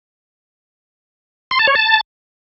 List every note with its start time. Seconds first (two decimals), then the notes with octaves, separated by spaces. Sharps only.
1.51 C6
1.59 A5
1.67 C#5
1.76 A5